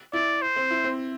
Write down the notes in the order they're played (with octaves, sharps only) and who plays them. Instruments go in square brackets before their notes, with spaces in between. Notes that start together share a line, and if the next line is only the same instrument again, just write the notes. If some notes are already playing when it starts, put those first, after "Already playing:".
[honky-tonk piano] E4 [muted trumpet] D5
[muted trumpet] C5
[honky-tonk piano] C4
E4
C4